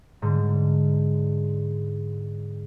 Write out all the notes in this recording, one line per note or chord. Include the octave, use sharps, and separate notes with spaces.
G#2 D3